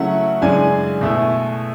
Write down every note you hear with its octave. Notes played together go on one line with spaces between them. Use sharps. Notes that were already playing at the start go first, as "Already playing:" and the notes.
Already playing: C#3 F#3 A3 C#4 E4 F#5
F#2 C#3 E3 G#3 D4 G#5
B2 A3 E4